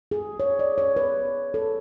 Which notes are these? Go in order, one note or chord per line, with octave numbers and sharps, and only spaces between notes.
G#4
C#5
D5
C#5
B4
A4